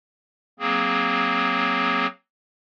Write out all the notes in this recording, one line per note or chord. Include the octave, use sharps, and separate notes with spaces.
F#3 A#3 C4 G#4